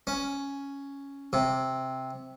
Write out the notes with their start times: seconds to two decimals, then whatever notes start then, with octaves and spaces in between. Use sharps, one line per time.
0.07 C#4
1.33 C3